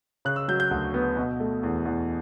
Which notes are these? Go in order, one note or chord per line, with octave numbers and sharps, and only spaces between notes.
C#3 F#6
E6
F#3 G6
G6
D2
B3
B2
A3
E2
E2